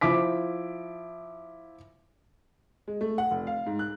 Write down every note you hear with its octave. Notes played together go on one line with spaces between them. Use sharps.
F3 E4 D6 B6
G#3
A3
F#5
F1
F5
G#2
F#6